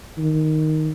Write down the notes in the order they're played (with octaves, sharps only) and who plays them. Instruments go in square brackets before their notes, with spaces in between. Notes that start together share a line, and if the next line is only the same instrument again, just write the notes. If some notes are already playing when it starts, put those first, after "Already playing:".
[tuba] D#3